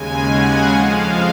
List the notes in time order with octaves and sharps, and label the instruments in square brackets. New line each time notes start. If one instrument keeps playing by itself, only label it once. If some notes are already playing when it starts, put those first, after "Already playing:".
Already playing: [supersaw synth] D#2 C#3 G#3 G#5
F#5
F2 F3 G#3 F5